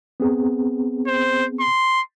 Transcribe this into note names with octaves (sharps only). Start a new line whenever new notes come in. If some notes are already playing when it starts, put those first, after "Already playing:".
B3 C4 G#4
C5
C6